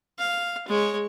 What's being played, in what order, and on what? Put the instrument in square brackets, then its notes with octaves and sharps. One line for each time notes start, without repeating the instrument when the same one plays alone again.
[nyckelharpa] F5
G#3 C#5